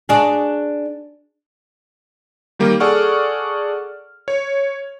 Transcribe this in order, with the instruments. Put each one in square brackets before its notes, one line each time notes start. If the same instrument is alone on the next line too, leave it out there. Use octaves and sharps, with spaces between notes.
[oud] D4 F#4 G#4
[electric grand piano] D#3 G3 A#3
G#4 A4 D5 F#5 C#6 F6
C#5